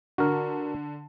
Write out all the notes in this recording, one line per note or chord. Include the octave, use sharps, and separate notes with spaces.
D3 F#4 A#4